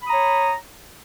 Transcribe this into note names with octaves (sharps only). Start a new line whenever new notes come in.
C#5 A#5 B5 D#6